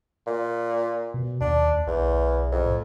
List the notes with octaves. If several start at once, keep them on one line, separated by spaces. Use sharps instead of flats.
A#2
B2
D#2 D4
B1 E2
F2
A2